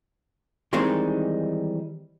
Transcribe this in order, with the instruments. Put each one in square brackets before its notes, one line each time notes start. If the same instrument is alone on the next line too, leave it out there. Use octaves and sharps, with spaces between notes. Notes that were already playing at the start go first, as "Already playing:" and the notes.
[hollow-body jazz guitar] D#3 E3 G3 G#3 C4 D#4